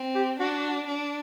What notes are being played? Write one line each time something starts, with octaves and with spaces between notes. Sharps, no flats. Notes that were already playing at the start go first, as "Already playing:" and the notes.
Already playing: C4
G4
D4 F#4
D4